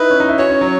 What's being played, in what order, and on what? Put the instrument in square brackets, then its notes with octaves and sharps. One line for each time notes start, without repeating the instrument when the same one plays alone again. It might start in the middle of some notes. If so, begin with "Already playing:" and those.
Already playing: [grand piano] D#4 E4 [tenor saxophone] B4
[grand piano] C#4
D#4
E4
[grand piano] F#4 [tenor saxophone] C#5
[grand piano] C#4
F#3